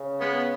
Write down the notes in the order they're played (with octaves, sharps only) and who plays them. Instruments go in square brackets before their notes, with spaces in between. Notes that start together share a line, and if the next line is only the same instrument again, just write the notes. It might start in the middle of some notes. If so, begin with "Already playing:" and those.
Already playing: [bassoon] C#3
[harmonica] G#3 B3